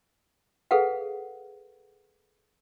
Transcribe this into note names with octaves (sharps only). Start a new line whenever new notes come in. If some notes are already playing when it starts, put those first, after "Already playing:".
G#4 A4 B4 F5 F#5